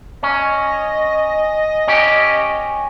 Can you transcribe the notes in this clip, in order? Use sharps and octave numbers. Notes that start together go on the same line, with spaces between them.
C#4 D#5
C#4 G4